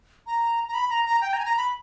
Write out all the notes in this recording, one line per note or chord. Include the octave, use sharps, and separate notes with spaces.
A#5
A#5
B5
A#5
A#5
G5
A#5
G#5
A#5
B5